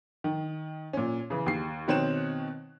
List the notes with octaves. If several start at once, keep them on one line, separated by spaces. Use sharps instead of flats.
D#3
A#2 C#4
C#3 E3
D#2 C7
B2 D#3 C4 C#5 F#6 E7